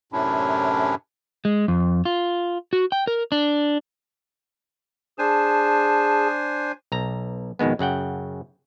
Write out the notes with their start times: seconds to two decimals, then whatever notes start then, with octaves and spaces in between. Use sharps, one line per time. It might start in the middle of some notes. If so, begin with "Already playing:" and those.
0.12 F#2 A2 C3 C#4 D4 E4
1.45 G#3
1.68 F2
2.05 F4
2.73 F#4
2.92 G5
3.07 A#4
3.32 D4
5.19 D4 G#4 C5 G#5 A5
6.92 B1 A#5
7.59 F2 B2 D#3 G#3 B3
7.79 F#2 C#3 F#5 G5